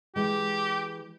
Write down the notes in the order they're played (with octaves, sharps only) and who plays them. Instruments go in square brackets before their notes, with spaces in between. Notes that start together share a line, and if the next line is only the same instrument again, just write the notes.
[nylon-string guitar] E3 G#3 [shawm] G4